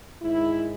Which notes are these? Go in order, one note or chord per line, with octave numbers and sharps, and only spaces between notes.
G#2 D#3 G#3 E4